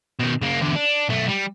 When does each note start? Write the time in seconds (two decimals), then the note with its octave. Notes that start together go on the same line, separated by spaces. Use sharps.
0.20 B2 D#3
0.42 C#3 A#3
0.62 E2 D3
0.76 D4
1.09 B1 A3
1.28 G3